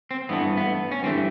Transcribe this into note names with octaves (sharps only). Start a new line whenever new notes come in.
C4
G2 E3 A3 B3
B3
C#4
G2 E3 A3 C4